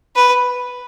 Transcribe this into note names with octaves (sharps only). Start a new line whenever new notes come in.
B4